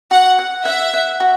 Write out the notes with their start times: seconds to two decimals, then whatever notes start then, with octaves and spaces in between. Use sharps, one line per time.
0.11 F#4 F#5
0.39 F#5
0.65 E5 F#5
0.94 F#5
1.20 F#4